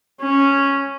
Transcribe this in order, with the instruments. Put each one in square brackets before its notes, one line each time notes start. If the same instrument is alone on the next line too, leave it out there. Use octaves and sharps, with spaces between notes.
[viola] C#4